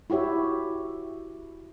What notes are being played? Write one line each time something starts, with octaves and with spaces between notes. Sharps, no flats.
E4 F#4 G4 C#5 E5